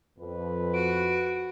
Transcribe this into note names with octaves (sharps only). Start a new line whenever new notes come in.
F2 B4
F#4 D7